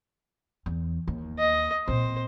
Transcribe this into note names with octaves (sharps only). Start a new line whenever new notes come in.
E2
D#2
D#5
A#2 C4 C5